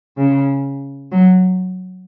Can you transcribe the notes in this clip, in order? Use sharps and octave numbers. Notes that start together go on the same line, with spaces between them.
C#3
F#3